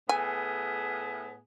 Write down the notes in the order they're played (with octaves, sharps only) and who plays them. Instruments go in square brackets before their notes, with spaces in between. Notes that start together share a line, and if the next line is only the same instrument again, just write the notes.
[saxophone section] A2 B3 G#4 [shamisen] G#5